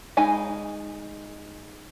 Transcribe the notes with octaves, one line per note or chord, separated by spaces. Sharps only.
G#3 D#4 G#5 B5